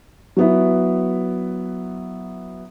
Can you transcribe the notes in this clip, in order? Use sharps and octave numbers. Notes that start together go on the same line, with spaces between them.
F#3 B3 E4